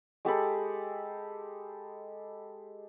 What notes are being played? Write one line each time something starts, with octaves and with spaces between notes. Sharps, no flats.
G#3 G4 A4 B5